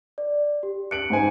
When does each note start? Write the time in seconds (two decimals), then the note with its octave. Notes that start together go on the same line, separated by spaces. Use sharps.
0.18 D5
0.63 G4
0.91 F#6 C#7 D7 F#7
1.10 G#2 C5 G#5